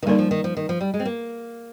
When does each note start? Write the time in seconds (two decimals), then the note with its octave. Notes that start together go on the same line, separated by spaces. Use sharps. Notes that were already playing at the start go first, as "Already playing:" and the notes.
0.03 D#3
0.06 D3 G3 A#3 D#4 A#4 D5
0.19 F3
0.31 D#3
0.44 F3
0.57 D#3
0.69 F3
0.81 G3
0.94 G#3
1.00 C4
1.05 A#3